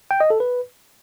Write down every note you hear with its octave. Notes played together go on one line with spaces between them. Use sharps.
G5
D#5
A4
B4